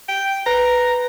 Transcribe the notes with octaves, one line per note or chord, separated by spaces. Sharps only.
G5
B4 A#5